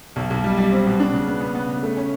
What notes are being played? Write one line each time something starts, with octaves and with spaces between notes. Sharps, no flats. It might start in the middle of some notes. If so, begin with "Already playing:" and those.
B1
B1
G3
G3
C4
B2
D4
C#3
B3
B3
B3
C#3
A3
C#4